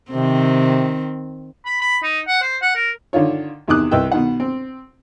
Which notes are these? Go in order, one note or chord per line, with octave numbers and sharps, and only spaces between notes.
C3 D#3 C4
B5
B5
D#4
F#5
C5
F#5
A#4
D3 D#3 F4 C#5
E2 C3 D#3 D6 D#6 F#6
C2 B4 D#5 G5 E6
B2 D#3 F#5
C4